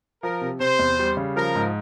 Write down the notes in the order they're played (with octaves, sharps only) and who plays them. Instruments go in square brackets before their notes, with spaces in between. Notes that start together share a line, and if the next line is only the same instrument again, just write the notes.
[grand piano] F3 [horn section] A#4
[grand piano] C3
[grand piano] C3 [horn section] C5
[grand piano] E2
G3
C#3
[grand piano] F3 [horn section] A#4
[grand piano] G#2